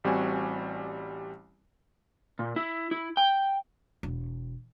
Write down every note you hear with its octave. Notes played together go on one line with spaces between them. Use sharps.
A1 G3 C4 F#4 G#5
A#2
E4
E4
G5
E1